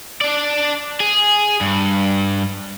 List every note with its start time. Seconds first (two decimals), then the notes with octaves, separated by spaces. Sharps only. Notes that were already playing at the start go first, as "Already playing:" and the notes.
0.21 D4 D5
1.00 G#4
1.61 G2